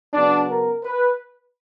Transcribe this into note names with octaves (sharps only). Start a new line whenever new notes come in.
C#3 F#3 B3 D4
A#4
B4